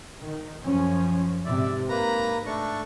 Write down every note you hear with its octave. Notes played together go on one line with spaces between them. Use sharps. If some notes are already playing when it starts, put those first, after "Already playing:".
D#3
F#2 F3 C#4
G#2 C3 D5 E5
G#2 A#3 B4 A#5
A3 D4 C#6